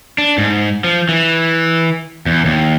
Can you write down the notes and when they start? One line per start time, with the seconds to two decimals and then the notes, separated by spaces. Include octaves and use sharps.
0.18 D4
0.38 G#2
0.84 F3
1.09 E3
2.26 E2
2.45 D#2